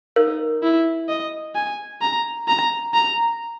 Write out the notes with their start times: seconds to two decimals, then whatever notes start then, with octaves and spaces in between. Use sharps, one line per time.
0.16 D#4 A#4
0.63 E4
1.09 D#5
1.55 G#5
2.01 A#5
2.48 A#5
2.94 A#5